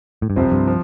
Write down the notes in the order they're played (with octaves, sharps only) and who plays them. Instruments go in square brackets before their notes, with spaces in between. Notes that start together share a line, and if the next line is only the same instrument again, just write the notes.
[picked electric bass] A2
G2
[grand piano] C2 C3 F3 C4 [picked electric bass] F2
[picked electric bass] G2
[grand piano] F3